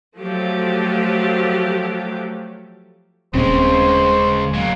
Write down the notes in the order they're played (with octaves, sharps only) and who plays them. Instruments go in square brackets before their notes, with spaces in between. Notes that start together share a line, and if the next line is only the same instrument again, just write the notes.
[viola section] F3 F#3 A3 G4
[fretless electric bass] D#1 C4 [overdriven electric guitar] C#3 G#3 [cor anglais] C5
[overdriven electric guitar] F#3 A#3